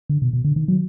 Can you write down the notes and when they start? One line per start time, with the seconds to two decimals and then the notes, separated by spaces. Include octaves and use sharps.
0.09 D3
0.22 B2
0.33 B2
0.45 D3
0.56 D#3
0.68 F#3